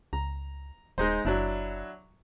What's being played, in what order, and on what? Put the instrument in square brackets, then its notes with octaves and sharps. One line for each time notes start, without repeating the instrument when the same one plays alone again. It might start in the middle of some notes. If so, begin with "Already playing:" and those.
[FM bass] C#2 [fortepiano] A#5
[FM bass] D#1 [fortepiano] G#3 D#4 C5
[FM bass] F#1 [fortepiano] F#3 D4 E4